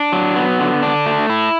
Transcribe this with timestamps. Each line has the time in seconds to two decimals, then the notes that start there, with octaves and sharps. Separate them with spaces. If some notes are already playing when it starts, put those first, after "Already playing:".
Already playing: D4
0.13 F#3
0.36 B3
0.60 D3
0.83 D4
1.06 A3
1.30 E4